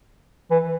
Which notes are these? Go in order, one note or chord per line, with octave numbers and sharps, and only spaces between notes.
E3